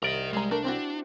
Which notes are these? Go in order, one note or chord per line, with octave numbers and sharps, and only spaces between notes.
C2 A#4 D5 D#5
G3 G#3 A#5
A3 D4 A#4
C4 E4 F#4